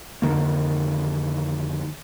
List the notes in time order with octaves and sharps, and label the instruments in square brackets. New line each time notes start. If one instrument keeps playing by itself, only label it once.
[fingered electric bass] F2 D3 D#3 A#3